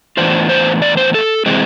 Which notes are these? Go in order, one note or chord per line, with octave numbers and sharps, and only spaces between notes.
A2 E3 B3 D4 F4 C5
C5
D5
C5
A4
C3 E3 G#3 C4